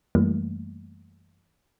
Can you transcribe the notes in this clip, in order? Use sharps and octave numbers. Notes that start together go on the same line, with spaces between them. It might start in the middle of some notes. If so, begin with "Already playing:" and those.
F#2 E3 G3 A3 A#3